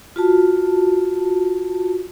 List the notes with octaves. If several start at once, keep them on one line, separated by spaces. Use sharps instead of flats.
F4 F#4 A5